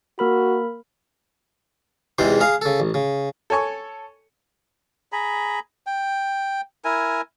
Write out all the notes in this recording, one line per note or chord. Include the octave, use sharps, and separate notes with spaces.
A#3 F#4 A#4 B5
E2 G#2 C3 E3 C5
G#4 F5 A#5
C#3 A4
A1
C#3
A4 C#5 G#5 C#6
G#4 A#5 B5
G5
E4 A#4 G#5